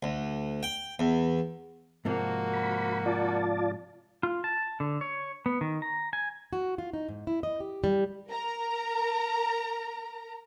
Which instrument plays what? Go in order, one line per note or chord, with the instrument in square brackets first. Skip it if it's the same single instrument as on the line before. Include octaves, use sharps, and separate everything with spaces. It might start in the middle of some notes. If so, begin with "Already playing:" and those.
[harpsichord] D2
G5
E2
[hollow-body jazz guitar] G#2 C3 F3 [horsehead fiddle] A#3 F#4
[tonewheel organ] B5
F4 D5 A5
[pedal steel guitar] F4
A5
D3
C#5
B3
D#3
A#5
G#5
[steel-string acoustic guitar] F#4
F4
D#4
G#2
E4
D#5
G4
G3
[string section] A#4 A#5